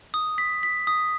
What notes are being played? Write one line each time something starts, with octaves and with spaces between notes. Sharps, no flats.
D#6
B6
B6
D#6